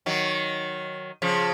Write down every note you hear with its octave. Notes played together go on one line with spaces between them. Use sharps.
D#3 F#3
C#3 F3